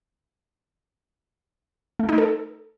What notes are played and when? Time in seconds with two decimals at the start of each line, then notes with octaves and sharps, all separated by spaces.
1.99 A3
2.09 D#4
2.18 A4